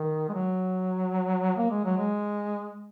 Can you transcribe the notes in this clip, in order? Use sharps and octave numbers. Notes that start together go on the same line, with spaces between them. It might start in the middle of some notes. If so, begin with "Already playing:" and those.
Already playing: D#3
G#3
F#3
A#3
G#3
F#3
G#3